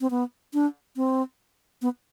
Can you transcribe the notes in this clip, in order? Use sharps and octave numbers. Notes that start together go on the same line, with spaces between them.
C4
B3
D4
C4
B3